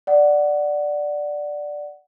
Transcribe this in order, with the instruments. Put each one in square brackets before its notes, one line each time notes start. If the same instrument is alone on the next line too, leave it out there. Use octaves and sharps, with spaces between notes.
[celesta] D5 F#5